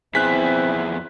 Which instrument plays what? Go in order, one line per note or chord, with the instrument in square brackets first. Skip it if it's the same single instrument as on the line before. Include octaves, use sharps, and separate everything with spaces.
[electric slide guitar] F2 B3 G#4 [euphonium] C4 [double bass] E4 [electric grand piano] F#6 B6